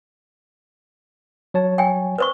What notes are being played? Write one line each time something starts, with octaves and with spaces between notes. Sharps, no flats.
F#3 C#5 A5
G5 G#5
B4 C5 C#6